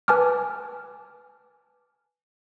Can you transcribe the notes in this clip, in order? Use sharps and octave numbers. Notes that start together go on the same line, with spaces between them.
B4 G#5 A5 D6 F6